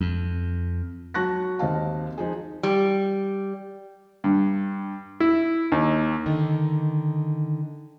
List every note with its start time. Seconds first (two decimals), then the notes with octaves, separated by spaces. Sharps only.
0.01 F2
1.14 F#3 A5 C#6 F#6 A#6
1.59 D#2 C4 D#5 F5 A5
2.18 F3 D#4 G#4
2.63 G3
4.24 G2
5.20 E4
5.72 D#2
6.26 D3 D#3 D#4